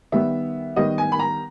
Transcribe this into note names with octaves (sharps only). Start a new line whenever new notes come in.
D#3 G3 B3 E5
D#3 G3 B3 D#5
G#5
B5
A#5